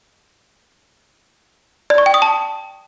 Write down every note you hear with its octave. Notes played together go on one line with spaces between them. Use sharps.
D5
C#6
G5
D#6
A5